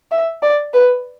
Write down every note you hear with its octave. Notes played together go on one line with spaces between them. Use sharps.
E5
D5
B4